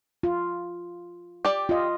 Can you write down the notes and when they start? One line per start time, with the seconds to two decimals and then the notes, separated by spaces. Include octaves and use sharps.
0.23 F4
1.45 G4 D5
1.69 F4 D#5